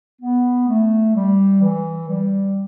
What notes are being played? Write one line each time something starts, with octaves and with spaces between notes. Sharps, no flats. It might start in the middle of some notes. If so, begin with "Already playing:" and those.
B3
A3
G3
E3
G3